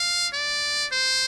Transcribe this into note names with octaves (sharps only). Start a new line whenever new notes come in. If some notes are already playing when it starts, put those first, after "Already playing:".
Already playing: F5
D5
C5